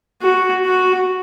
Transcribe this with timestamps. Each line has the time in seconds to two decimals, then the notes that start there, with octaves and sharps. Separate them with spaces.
0.22 F#4
0.65 F#4